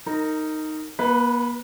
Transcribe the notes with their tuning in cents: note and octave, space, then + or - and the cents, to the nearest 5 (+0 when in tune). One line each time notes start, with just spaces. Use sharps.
D#4 +0 A#4 -25
A#3 +45 B4 +0